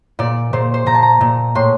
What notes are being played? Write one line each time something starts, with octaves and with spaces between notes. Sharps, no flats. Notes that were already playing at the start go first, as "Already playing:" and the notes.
A#2 D5
A#2 C5
C5
A#2 A#5
A5
A#5
A#2
A2 C6